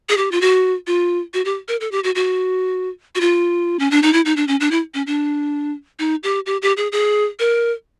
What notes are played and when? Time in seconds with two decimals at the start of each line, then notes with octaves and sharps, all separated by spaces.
0.09 G#4
0.17 G4
0.32 F4
0.41 F#4
0.87 F4
1.34 F#4
1.45 G4
1.68 A#4
1.81 A4
1.92 G4
2.04 F#4
2.15 F#4
3.15 F#4
3.21 F4
3.79 C#4
3.91 D4
4.03 D#4
4.13 E4
4.25 D#4
4.37 D4
4.48 C#4
4.60 D4
4.71 E4
4.94 C#4
5.07 D4
5.99 D#4
6.23 G4
6.46 G4
6.62 G4
6.77 G#4
6.92 G#4
7.39 A#4